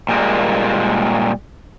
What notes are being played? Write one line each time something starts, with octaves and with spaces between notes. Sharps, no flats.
A#2 G3 G#3 A#3